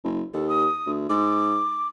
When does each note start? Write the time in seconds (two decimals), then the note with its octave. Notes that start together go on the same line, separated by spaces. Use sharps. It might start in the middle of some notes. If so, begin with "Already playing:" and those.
0.04 F#1
0.34 D#2 A4
0.49 D#6
0.86 D2
1.09 G#2 D6